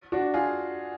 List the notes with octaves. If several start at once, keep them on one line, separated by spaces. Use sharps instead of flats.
D4 F#4
F4 G#4